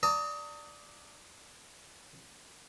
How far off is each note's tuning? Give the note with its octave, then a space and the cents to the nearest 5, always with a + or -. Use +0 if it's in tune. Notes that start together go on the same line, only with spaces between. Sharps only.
D5 +0 A#5 -45 D#6 +20